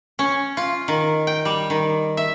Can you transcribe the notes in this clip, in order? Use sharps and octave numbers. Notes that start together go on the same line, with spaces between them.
C#4
F4
D#3
G5
G3
D#3
E5